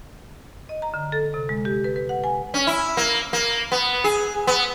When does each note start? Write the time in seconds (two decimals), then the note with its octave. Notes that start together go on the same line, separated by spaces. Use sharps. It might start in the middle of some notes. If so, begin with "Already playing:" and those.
0.69 D#5
0.82 A#5
0.94 D3
1.12 A4
1.34 C3
1.49 G#3
1.65 G4
1.84 B4
1.96 B4
2.09 F#5
2.24 G#5
2.54 C#4
2.67 E4
2.97 A#3
3.33 A#3
3.72 B3
4.04 G#4
4.47 B3